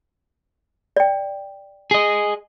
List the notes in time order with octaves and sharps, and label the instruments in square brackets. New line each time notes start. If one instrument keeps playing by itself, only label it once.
[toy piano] D5 G5
[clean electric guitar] G#4 D#5